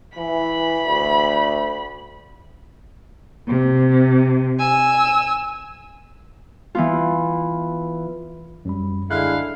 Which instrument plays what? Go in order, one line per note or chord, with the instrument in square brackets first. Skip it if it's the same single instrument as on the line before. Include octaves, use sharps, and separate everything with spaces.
[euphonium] E3 [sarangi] B5
[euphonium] D2
[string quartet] C3
G#5 E6
[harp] E3 B3 F4
[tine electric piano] F#2 G3 B5
[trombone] D3 [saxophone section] G#3 E4 [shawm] F5 [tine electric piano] F#6